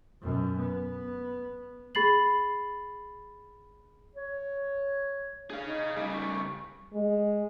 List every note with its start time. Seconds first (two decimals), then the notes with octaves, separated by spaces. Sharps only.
0.22 F#2 B2
0.59 B3
1.95 G#4 B5 A6 C7 F#7
4.16 C#5
5.50 D4 G#4 F5
5.66 D#4
5.96 C#3 G3
6.13 C#6
6.93 G#3